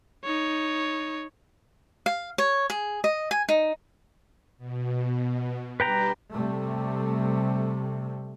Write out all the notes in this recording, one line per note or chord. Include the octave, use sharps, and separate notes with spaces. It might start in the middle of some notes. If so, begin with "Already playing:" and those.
D#4 C#5
F5
C#5
G#4
D#5
G#5
D#4
B2
G3 D4 G4 B4 G5 A#5
C3 G3 A3